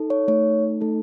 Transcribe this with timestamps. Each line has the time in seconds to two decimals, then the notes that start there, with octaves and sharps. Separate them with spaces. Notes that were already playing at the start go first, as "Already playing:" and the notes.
Already playing: D#4 A4
0.10 C#5
0.28 A3 D#4 A4 C#5
0.81 A3 D#4 A4